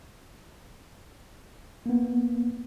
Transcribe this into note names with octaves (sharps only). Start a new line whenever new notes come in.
A#3 B3